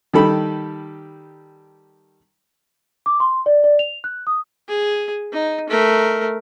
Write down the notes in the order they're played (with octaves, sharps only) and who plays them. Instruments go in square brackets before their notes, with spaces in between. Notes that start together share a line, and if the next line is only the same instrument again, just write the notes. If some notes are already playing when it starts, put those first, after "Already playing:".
[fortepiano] D#3 G3 A4 B5
[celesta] D6
C6
D5
D5
F7
F#6
D#6
[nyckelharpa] G#4
D#4
A3 A#4